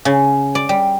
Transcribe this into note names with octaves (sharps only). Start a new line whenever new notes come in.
C#3
D5
G3